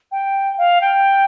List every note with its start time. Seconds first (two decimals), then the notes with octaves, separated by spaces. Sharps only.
0.12 G5
0.58 F5
0.81 G5